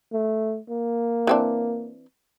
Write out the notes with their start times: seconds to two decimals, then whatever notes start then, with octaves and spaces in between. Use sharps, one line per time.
0.13 A3
0.70 A#3
1.27 E3 C4 D4